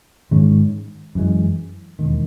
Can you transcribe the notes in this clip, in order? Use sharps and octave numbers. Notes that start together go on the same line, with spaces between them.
G#2 D#3 G#3 C#4
F#2 E3 G#3
E1 D#2 D#3